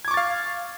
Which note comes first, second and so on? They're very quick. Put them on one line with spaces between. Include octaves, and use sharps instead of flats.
G#6 D6 C#6 A6 F5